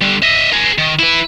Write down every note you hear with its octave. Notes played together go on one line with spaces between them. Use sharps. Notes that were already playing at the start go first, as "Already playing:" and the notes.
D3 G3
D#5 E5
G#4 A#4
D#3
E4 B4